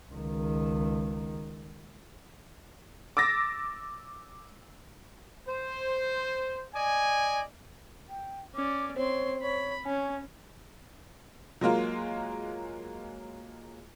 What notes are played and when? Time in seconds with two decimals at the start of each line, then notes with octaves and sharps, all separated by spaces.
0.11 C#2 D#3
3.17 D6 E6 A6 A#6
5.47 C5
6.74 D5 D#5 G#5
8.09 G5
8.55 C#4 D5 D6
8.96 C4 C5 C#5 C6
9.42 C#5 B5
9.85 C#4 C#5 G#5
11.61 F#3 G#3 A#3 F4